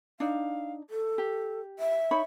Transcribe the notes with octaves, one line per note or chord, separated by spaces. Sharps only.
D4 D#4 F5
A4
G4
E5
D#4 C#5 B5